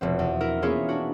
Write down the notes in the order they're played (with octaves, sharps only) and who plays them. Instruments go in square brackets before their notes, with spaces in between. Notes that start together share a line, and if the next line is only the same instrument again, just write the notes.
[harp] F1 B2 C4
E2
E4 A#4
A#3 B3 C#4 E4 F4 G#4
D4 F#4